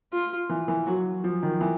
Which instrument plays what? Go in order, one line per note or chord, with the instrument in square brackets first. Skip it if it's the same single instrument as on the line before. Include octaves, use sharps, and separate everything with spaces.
[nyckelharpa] F4
[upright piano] E3
E3
[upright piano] F#3 [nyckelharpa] F#4
[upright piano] F3
D#3
E3